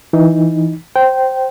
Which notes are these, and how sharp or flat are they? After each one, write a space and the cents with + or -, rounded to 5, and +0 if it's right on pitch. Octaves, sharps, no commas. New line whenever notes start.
E3 +0 D#4 +0
C5 +5 G5 -15